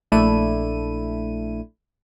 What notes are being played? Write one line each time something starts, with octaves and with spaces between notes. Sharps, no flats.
A#1 A3 D4 E4 D#7